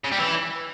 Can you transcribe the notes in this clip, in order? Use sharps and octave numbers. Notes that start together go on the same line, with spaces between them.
C#3
G3
E3